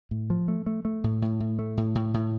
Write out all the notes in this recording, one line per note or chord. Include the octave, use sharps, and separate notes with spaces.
A2
F3
A3
A3
A3
A2
A2
A2
A3
A2
A2
A2